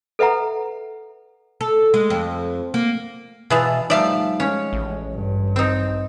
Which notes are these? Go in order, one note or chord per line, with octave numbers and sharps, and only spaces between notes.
A4 B4 E5 F#5 A#5
A4
G#3
F2
A#3
B2 E3 E4 F4 G#4 E5 A5
F3 G3 A3 D#4 D5 E5 F5
G#3 C#4 C#5
A1
G2
C4 D#4